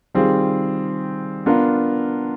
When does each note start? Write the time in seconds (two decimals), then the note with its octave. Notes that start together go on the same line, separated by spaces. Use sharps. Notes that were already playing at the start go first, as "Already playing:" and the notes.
0.15 D#3 G3 C4 F4 G#4
1.46 B3 D4 F4 A#4